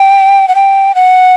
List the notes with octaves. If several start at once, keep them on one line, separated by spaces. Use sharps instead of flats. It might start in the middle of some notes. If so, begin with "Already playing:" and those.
Already playing: G5
F#5
G5
F#5